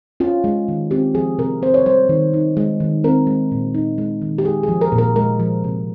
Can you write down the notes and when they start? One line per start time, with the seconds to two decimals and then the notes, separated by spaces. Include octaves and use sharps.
0.20 C#4 F4
0.44 G#3
0.68 D#3
0.91 C4 G4
1.14 F3 G#4
1.39 C3 A#4
1.62 C4 C5
1.74 C#5
1.86 G3 C5
2.09 D#3
2.34 D#4
2.57 G#3
2.80 D#3
3.04 C4 A#4
3.27 G#3
3.52 A#2
3.74 D#4
3.98 G#3
4.22 D#3
4.38 G4
4.45 G#3 G#4
4.63 G#4
4.68 F3
4.81 A#4
4.92 A#2
4.98 A#4
5.16 G#3 A#4
5.40 F3
5.64 C3